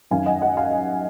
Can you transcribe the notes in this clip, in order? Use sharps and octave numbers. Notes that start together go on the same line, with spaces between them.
F#2 D#3 F5 G#5
D#5 F#5
D#5 F#5
F5 G#5